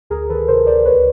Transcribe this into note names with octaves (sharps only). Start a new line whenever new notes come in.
D2 G#4 A#4
D#3 A4 B4
C3 A#4 C5
D2 C5 D5
C#2 B4 C#5